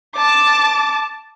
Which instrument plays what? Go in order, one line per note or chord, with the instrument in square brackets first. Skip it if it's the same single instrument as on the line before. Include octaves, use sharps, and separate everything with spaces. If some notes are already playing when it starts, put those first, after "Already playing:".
[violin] A5 D6